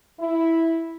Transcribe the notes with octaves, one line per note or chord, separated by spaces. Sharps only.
E4